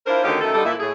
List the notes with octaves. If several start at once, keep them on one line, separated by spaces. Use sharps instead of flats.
D4 E4 F4 A#4 C5
D2 D3 D#3 C#4 D#4 G4
F#2 D#3 A3 A4
D3 G3 D#4 A4
A#2 E4 E5
A2 G#4